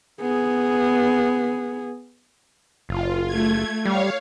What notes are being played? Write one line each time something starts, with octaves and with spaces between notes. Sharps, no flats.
B3 G#4
F#1 F4
A3 G#6
G3 C#5 F5